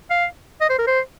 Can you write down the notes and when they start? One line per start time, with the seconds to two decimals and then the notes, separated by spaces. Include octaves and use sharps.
0.10 F5
0.61 D#5
0.69 C5
0.78 A#4
0.87 C5